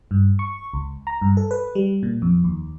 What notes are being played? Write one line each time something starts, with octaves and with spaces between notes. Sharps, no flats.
G2
C#6
C#2
A#5
G2
A4
B4
G3
A#2
F2
D#2